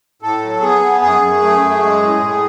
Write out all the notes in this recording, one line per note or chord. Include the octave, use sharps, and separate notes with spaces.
A2 A4
F#3
B3 G#4
B3
F#2 G#4
F#2
A3
F#2
G#3
A2
A2